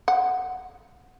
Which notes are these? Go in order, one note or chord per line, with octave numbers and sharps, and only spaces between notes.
F#5